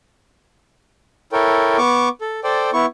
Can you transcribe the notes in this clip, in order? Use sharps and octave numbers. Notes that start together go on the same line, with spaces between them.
E4 A4 A#4 C#5 G5
B3 C#6 D6
A4
A4 C5 D5 G5
B3 E4 C#6